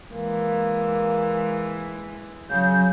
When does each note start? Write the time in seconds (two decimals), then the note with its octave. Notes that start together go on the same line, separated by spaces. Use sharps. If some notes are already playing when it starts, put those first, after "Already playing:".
0.13 E3 G#3 A#3
2.50 C#3 F#3 G6